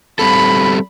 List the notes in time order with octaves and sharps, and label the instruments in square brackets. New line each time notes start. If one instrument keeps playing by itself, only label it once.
[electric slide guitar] G3 C4 A4 [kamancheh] B5